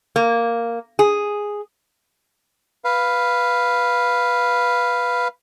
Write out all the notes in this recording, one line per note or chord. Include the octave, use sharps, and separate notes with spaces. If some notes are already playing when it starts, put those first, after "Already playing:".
A#3
G#4
B4 F5